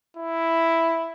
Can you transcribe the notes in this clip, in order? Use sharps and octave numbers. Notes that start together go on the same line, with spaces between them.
E4